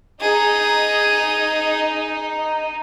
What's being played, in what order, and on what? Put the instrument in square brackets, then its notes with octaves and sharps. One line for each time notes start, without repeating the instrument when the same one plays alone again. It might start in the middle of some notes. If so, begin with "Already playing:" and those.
[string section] D#4 [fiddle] G#4